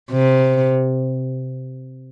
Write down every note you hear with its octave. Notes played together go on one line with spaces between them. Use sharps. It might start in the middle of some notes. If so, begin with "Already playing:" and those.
C3